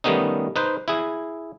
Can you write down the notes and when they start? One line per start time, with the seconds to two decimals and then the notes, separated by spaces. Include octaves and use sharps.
0.04 D#3 G3 A3 B3 C#4 D#4
0.56 D#4 B4 C5
0.88 E4 G#4